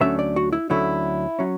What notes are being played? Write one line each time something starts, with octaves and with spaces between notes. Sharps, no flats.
D2 D3 F#3 A3 C#4 E5
D5
F#4
E4
D2 D3 F#3 A3 C#4 E4
F#3 C#4